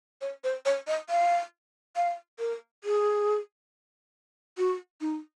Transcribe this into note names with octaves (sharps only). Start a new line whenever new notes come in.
C#5
C5
C#5
D#5
F5
F5
A#4
G#4
F#4
D#4